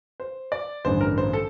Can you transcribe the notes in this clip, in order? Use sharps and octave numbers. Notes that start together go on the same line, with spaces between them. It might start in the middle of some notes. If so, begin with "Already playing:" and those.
C5
D5
A1 G2 D3 C5
A#4
C5
A4